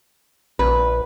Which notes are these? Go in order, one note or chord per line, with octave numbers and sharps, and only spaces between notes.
A#1 B4